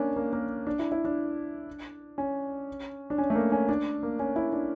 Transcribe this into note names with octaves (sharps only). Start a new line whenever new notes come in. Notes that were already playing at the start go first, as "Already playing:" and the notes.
Already playing: A#3 C#4 D4
A#3
A#3
D4
E4
E4
D4
C#4
D4
C#4
A3
A#3
C#4
D4
A#3
C#4
E4
D4